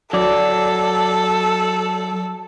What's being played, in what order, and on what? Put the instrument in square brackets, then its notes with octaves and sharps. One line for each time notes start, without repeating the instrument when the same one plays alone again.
[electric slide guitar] F#3 D5 [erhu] A4